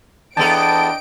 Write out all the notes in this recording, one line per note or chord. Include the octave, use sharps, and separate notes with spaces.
E2 B3 D4 A4 D#5 G5 A5 D7